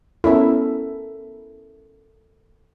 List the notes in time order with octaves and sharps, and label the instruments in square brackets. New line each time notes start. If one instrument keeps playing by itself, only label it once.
[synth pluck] B3 C#4 E4 [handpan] A4 A#4 E5